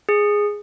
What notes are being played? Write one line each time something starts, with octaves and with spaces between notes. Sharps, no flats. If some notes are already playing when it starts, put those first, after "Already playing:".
G#4